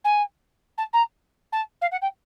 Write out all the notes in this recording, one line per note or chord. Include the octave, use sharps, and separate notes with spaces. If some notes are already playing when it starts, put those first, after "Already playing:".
G#5
A5
A#5
A5
F5
F#5
G5